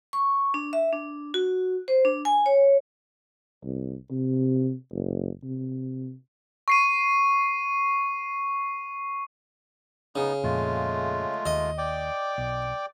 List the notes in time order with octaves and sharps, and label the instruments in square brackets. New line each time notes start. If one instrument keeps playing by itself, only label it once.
[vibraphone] C#6
D4
E5
D4
F#4
C5
D4
G#5
C#5
[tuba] C2
C3
F#1
C3
[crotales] C#6 C7 D#7
[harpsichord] C#3 [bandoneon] B3 D#4
[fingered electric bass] F2 A#2 [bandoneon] G#3 A3 F4
[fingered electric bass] D#2 [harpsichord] D#5
[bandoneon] D5 G5 D6
[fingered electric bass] B1